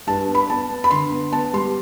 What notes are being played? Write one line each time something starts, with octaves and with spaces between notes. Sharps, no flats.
G2 A5
B3
B5
B3 A5
B3
B5
D3 C6
B3
B3 A5
G3 C6